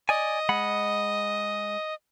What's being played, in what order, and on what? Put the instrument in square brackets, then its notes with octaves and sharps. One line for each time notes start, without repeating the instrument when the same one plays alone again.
[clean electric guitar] D5 G#5 [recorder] D#5
[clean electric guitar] G#3 F#5 B5